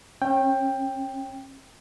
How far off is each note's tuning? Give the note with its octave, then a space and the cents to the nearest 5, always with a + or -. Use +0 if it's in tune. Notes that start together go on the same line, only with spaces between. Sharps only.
C#4 -30 G5 +10